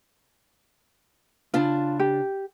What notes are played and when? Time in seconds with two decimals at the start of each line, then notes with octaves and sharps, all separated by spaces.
1.54 C#3 D4 F4 A5
2.00 G4